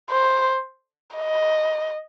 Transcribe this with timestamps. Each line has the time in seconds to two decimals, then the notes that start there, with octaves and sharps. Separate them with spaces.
0.10 C5
1.15 D#5